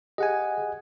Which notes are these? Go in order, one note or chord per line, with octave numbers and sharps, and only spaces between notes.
G4 G#4 D#5 F#5 G#5